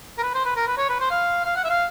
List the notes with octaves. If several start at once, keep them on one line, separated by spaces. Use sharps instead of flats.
A#4
B4
C5
B4
A#4
B4
C#5
B4
C5
F5
F5
F#5
E5
F5